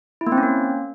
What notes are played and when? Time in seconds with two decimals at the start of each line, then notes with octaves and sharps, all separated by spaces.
0.21 E4
0.27 A#3
0.32 C4
0.38 C#4
0.43 A#3